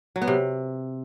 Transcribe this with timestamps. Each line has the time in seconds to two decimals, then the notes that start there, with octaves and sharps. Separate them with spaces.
0.16 F#3
0.22 B3
0.27 C3